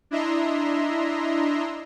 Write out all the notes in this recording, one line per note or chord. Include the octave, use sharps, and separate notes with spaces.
D4 E4 D#5 E5 A#5 C6